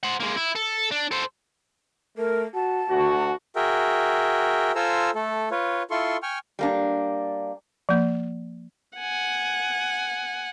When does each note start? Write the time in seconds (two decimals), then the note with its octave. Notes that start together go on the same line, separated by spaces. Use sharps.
0.03 C5 F#5
0.20 G#3 A#3
0.36 E4
0.55 A4
0.91 D4
1.11 A4 C5
2.18 A3 A#4
2.55 F#4 A5
2.90 D2 F#4
3.56 F#4 G#4 A#4 E5 G5
4.75 F4 A4 C5 G#5 A#5 E6
5.15 A3 A4
5.51 F4 B4 C#5
5.91 E4 F4 A4 C6 C#6
6.23 G5 G#5 C#6 F6
6.59 G3 A#3 D4
7.89 F3 A#3
8.97 F#5 G#5